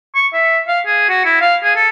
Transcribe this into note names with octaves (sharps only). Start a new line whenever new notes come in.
C#6
E5
F5
G#4
F#4
E4
F5
G#4
A4